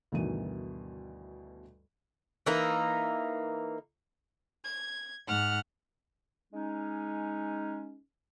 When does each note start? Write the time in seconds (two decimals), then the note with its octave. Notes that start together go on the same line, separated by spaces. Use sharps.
0.12 D2 G2 B2 D#3 E3 D#7
2.46 E3 A#3 D#4
4.64 G#6
5.26 G#2 F#5 F6
6.53 G#3 C#4 D#4